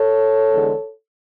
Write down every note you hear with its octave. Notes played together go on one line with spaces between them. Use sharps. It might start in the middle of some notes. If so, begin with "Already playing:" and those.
Already playing: A4 C#5
E2 D3 G#3